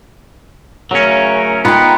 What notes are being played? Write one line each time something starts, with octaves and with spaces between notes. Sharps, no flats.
C#3 F#3 A3 C#4 A#4
B3 D#4 F4 B4 G5 A#5